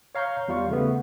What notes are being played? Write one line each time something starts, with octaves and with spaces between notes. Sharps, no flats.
C#5 F5 A#5 C#6 G6
E2 G3 F4 F5 C#6
C#3 A3 B3